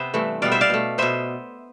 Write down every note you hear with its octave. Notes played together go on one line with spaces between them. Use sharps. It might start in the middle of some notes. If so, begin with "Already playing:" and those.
Already playing: C3 B3 C5 E5
G2 E3 A3
B2 G3 B3 D5 F5
C5 E5
D5 F5
B2 A3
B2 B3 C5 E5